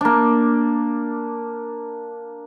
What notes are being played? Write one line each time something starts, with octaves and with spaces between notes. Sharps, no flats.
A#3 D4